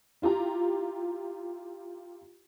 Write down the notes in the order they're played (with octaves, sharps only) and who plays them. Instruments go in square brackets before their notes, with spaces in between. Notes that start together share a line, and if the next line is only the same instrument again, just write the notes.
[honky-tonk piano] E4 F4 G4 A#5